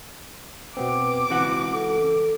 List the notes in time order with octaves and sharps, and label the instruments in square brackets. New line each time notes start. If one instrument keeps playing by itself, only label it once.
[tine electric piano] B2 B3 C4 [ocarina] B4 [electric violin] D6
[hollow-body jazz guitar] C#2 F#4 F#5 [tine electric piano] E3 [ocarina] C4
[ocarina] A4